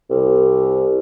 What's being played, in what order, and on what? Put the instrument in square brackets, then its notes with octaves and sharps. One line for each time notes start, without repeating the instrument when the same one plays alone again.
[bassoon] C2